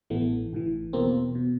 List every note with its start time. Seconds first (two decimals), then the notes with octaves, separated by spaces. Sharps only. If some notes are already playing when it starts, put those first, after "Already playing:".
0.10 A1 A2 E3 A3 B3
0.53 A1 A2 E3
0.93 E2 B2 A#3 C4
1.35 B2